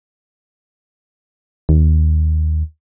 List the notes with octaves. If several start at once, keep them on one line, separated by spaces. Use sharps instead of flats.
D#2